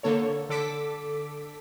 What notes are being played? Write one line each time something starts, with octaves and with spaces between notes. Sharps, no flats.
D3 A#3 A4 C#5
D3 A4 D6 B6